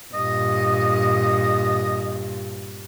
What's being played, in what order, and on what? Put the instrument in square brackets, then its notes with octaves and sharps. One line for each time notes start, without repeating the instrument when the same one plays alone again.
[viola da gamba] G2 A#2 [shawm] D#5